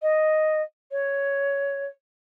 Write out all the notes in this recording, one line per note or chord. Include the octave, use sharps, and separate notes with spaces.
D#5
C#5